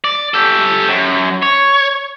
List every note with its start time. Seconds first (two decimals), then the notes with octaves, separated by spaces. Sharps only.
0.04 D5
0.34 G4 A4
0.89 F#2
1.42 C#5